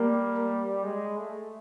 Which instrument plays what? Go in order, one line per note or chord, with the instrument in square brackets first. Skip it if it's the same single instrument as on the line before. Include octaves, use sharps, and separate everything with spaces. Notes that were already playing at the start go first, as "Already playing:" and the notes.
Already playing: [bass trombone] G3 [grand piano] A#3
[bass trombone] G#3
A3